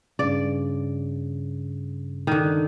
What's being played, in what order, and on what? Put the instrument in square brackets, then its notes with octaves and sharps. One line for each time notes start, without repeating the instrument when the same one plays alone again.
[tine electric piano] G2 C#3 [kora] D5
[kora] D3 D#3